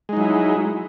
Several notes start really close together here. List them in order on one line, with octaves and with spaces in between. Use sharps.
G#3 D#4 F#3 E4